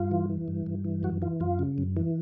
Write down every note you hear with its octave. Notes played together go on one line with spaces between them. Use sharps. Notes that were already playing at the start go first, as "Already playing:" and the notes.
Already playing: G2 F4
E3
E3
G2
G2
E3
F#2 F#4
E3 F4
F#2 F4
C#3
F#2
E3